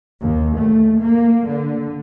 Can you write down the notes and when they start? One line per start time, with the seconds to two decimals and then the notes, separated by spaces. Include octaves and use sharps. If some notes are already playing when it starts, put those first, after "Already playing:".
0.21 D#2
0.58 A3
1.01 A#3
1.48 D3